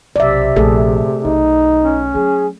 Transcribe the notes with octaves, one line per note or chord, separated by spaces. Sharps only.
B1 C3 D5 E5
A#1 A3 G#4 A4
B1 D#4
C#4
F#3 G#4